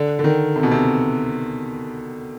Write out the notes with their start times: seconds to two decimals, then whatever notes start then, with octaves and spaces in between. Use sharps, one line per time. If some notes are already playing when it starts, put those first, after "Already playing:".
Already playing: D3
0.19 D3
0.24 D#3
0.56 C3
0.63 B2
0.71 C3